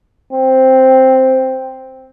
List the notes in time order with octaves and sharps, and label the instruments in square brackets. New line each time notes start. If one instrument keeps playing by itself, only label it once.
[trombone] C4